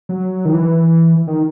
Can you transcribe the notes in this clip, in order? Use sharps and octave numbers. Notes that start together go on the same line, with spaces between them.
F#3
D#3
E3
D#3